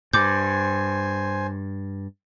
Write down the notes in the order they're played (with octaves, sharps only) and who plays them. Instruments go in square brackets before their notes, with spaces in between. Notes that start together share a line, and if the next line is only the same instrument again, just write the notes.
[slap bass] G2 [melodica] C5 G#5 [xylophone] D6 G6